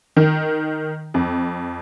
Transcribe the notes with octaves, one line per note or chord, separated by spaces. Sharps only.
D#3
F2